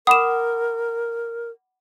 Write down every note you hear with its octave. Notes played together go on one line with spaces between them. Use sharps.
A#4 F#5 B5 D6 D#6 E7